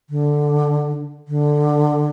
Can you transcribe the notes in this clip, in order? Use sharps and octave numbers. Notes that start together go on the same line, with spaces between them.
D3
D3